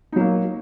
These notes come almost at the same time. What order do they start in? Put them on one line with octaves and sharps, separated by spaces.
D#4 F#3 A#3